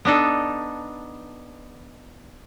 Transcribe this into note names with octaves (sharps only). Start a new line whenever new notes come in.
B3 D4 D#4 A4